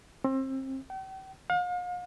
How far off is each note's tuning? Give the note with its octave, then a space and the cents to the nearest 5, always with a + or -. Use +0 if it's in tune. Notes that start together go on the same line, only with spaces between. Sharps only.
C4 +30
G5 -40
F5 +40